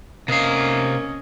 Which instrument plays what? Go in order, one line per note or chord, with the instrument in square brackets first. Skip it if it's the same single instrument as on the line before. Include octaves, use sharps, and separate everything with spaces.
[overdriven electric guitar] C3 F5 [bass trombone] A#3 [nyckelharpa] C#4 D#5